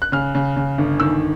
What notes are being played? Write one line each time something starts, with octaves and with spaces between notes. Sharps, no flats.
F#6
C#3 F6
C#3
C#3
G1
D#3 E6